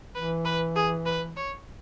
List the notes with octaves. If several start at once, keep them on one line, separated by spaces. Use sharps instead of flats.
E3 B4
B4
G#4
B4
C#5